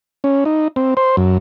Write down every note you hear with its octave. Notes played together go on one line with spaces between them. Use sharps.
C#4
D#4
C4
C5
F#2